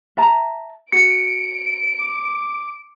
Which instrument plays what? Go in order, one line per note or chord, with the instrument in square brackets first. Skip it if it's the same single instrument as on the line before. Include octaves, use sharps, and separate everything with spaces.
[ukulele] E5 A5 A#5
[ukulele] F#4 [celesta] C#7 [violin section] D7
[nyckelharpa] D6